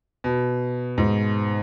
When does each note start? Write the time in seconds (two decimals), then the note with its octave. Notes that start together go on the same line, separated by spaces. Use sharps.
0.24 B2
0.98 G#2